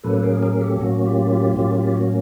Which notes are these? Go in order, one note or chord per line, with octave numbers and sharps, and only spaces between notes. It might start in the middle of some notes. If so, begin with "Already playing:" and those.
A2 F#3 A#3 C#4 A4 B4
G#4 A#4
G#4 A#4
G4 A4
A2 F#3 A#3 C#4 F#4
F4 G4
F4 G4
A2 F#3 A#3 C#4 F4 G4
F4 G4
F#4